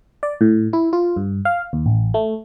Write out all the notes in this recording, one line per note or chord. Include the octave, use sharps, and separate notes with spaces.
D5
A2
E4
F4
G2
F5
D#2
A1
A3